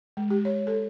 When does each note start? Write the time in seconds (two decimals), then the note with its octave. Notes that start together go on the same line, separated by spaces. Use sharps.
0.17 G#3
0.30 G4
0.45 C#5
0.67 A4